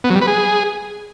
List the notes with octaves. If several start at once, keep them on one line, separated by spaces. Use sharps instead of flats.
B3
F#3
G3
B4
G#4